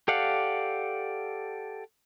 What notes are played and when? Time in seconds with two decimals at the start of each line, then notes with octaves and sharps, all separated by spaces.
0.08 G4 A4 D5 F5 F#5